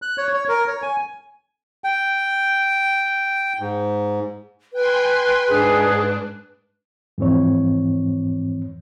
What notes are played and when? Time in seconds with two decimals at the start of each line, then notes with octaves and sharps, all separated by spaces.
0.02 F#6
0.17 C#5
0.33 C#5
0.49 A#4
0.68 C#5
0.82 G#5
1.84 G5
3.60 G#2
4.73 B4 G5 G#5 C6
5.48 G#2 D4 G#4
7.18 F2 G#2 E3 C4 C#5